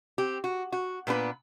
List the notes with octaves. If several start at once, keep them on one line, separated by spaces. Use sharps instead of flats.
C4 G4
F#4
F#4
A#2 B3 D4 B4